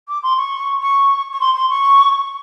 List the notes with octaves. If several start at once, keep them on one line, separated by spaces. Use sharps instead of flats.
D6
C6
C#6
C#6
C#6
C6
C6
C#6